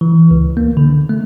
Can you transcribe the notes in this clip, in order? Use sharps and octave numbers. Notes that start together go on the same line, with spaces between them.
E3
C#2
A#3
D3
A3